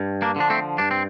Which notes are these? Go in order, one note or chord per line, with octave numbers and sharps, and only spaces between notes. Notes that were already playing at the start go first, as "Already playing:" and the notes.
Already playing: G2
A#3 D4
D3 F3 D4
A3 C4
G2 D4
C4